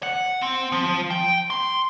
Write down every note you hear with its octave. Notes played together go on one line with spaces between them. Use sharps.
F#5
C4
F3
G5
C6